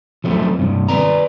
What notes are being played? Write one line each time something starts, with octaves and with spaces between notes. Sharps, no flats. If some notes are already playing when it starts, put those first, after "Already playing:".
F3 F#3 A3 C4
G2 C3
B4 D5 A#5